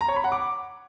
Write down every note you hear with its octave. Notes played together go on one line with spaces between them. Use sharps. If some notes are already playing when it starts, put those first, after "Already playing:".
A#5
C#5
B5
F#5
D6